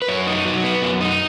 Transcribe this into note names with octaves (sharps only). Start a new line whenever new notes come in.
B4
F#2 C#5
D#4
F#3
B3
F#2
D#4